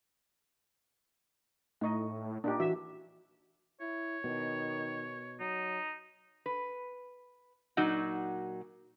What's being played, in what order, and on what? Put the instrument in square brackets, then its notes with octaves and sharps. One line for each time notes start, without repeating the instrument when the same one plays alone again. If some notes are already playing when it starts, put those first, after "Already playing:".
[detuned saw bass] A2 [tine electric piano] A3 C#6 [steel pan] D#4 D#5
[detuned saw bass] A#2 [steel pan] D4 D#4 G4
[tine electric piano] E3 [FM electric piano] F#4 [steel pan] E5
[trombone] E4 [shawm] C#5
[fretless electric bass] B2 [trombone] D#3
[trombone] F#3 [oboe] D#4
[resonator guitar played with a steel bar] B4
A#2 F#3 D#4 F#4